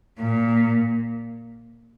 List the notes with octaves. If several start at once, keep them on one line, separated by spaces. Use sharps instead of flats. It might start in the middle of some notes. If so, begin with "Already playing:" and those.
A#2